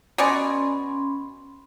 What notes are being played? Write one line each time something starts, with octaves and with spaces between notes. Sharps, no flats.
B2 C#4 D5 G#5 B5 C6